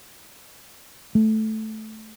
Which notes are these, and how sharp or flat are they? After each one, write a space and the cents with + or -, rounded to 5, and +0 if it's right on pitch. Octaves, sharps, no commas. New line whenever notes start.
A3 -10